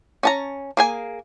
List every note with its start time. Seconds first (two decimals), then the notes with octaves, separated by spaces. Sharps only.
0.23 C#4 A5 A#5
0.77 A#3 G#4 G#5